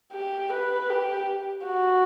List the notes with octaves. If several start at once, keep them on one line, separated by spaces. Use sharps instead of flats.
G4
B4
G4
F#4